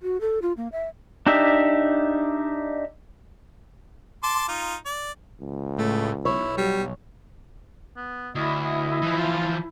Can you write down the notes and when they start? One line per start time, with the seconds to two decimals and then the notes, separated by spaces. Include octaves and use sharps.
0.02 F#4
0.21 A4
0.42 F4
0.57 A#3
0.72 E5
1.27 D4 D#4 G4 E5
4.23 A5 C6 D6
4.48 D#4 F4
4.86 D5
5.40 C#2
5.78 A2 A3
6.25 B1 E4 C#5
6.58 F#3 G3
7.96 B3
8.35 D2 E4 D#5
8.65 D#5
9.02 E3 F3
9.17 F4